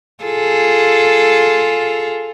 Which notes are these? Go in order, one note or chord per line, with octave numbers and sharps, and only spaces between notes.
F4 G#4 A4